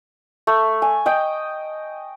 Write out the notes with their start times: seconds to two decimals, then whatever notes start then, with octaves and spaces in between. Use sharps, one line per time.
0.47 A3
0.82 G#5
1.06 D#5 G5